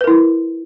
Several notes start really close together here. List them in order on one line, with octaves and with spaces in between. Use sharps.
B4 A#4 E4